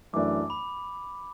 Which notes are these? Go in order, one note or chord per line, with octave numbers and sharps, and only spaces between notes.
F#2 E3 A3 D4 D6
B5